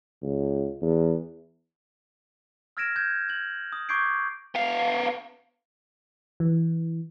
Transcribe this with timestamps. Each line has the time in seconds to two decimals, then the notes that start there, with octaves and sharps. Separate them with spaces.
0.23 C#2
0.82 E2
2.77 E6 F6 G#6 A#6 D7 E7
2.96 G6 G#6
3.29 G#6 F#7
3.72 D#6
3.89 C#6 D6 G6 G#6 C7 D7
4.55 B3 F5
6.40 E3